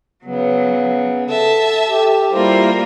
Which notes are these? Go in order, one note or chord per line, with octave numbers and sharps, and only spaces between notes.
C#3 F#3 B3
A4 E5 A5
G4
G3 A#3 E4 F4 A#4 C5